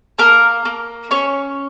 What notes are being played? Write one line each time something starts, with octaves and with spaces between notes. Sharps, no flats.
A#3 A#4
A#3
C#4 C#5